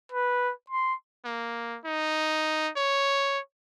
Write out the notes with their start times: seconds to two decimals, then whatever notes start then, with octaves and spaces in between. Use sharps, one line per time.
0.12 B4
0.70 C6
1.25 A#3
1.85 D#4
2.77 C#5